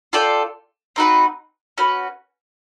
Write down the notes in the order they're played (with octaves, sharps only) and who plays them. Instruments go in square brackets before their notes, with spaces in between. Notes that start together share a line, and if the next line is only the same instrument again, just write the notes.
[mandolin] F4 A4 D5 G5
C4 D#4 F#4 B4
C#4 F#4 B4